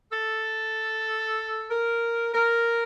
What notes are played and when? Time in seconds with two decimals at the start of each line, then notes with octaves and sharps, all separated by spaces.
0.12 A4
1.70 A#4
2.34 A#4